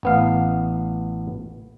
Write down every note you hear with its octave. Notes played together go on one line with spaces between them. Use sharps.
A1 B3 F5